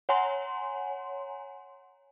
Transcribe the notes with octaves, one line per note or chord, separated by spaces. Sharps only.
C#5 F#5 G#5 A#5 C6